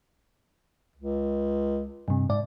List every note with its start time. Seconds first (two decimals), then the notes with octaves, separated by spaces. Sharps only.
0.96 C#2
2.08 G2 C3
2.29 G#2 D5